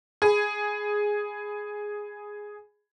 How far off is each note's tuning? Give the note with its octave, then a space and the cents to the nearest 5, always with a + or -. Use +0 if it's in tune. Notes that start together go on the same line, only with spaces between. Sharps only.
G#4 +0 B5 +15